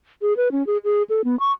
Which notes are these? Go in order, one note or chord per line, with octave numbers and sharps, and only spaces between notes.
G#4
B4
C#4
G#4
G#4
A4
B3
C#6